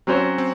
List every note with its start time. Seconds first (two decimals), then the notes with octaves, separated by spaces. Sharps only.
0.07 F#3 C4 C#4 F#4 C5
0.38 C4